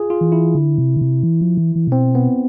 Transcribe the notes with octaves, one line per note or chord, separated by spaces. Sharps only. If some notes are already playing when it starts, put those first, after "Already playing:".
Already playing: F4 G#4
F4
E3
E4
D3
C3
D3
C3
E3
F3
E3
E3
C3
B2 C4
B3